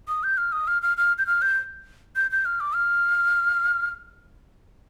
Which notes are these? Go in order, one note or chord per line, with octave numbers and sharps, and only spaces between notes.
D#6
G6
F6
D#6
F6
F6
F6
G6
F6
G6
G6
G6
F6
D6
F6